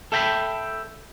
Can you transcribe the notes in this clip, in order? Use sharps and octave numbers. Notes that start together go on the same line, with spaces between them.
A4 E5 G5 A#5 B5